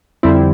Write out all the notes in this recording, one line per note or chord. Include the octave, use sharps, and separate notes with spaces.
F2 D3 G3 C4 E4